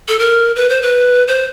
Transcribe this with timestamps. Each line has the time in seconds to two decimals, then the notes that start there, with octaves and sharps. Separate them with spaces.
0.08 A4
0.19 A#4
0.56 B4
0.69 C5
0.82 B4
1.28 C5